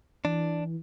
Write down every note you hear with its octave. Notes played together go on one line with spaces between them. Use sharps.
E3 D4